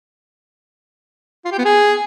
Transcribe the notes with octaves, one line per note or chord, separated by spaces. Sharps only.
F4
G4
B3
G#4